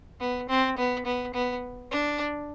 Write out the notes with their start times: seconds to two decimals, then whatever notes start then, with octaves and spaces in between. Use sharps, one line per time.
0.20 B3
0.49 C4
0.77 B3
1.05 B3
1.34 B3
1.91 D4